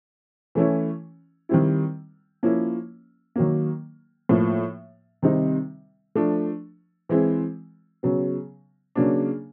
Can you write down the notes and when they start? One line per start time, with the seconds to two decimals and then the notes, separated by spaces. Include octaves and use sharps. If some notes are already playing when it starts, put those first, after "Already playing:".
0.55 E3 A3 C#4 E4
1.49 D#3 G3 C4 E4
2.43 F3 A#3 C#4 E4
3.36 D#3 F#3 A#3
4.29 A2 F3 A#3
5.22 C3 D#3 G3 C4 D#4
6.15 F3 A3 D4
7.09 E3 G#3 C4 E4
8.03 C#3 F#3 B3
8.95 C#3 F#3 A#3 D4